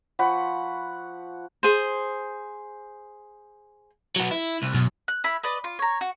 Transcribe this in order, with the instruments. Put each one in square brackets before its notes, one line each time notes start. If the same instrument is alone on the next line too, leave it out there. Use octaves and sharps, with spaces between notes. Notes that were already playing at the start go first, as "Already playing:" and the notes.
[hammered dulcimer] F3 F#5 B5 C#6
[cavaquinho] G#4 C5
[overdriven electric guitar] F#3 B3
E4
C2
[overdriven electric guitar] F#2 [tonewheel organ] B2
[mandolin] F#6
E4 B5
B4 D5 D#5
F4
C#5 A#5
F#4